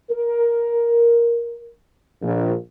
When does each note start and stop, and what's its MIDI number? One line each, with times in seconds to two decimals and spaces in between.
0.10 1.68 70
2.22 2.53 34